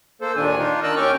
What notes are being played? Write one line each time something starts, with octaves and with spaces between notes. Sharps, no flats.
A#3 A4 C5
D#2 A#2 D#3 D4 G#5
D4 D#4 F4
D#3 A#4 D#5 A5 E6 F#6
D#2 C#4 G5 C#6 D6 F6